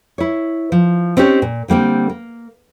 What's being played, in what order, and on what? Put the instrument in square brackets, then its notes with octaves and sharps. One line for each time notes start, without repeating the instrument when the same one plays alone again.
[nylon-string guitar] E4 C#5
F3
C4 C#4 D#4 G4 C#5
A#2
D3 G3 A#3 C4
A#3